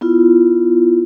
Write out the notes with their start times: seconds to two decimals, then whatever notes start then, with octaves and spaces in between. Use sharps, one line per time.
0.01 B3 E4 F4